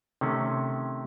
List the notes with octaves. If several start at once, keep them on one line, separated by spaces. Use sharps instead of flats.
C3 D#3 A3 C4 C#4